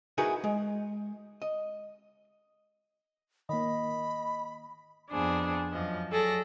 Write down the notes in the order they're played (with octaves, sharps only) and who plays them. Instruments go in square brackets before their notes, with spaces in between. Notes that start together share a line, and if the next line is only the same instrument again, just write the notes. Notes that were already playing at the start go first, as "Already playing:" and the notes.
[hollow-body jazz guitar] D#4 E4 F#4 G#4 A#4 B4
G#3
D#5
[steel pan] D#3 A#3 [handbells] D#5 [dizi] B5
[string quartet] F2 B3 D4 G#4 C5
F#2 F3 D#5
F#3 G#4 A4 D5 A#6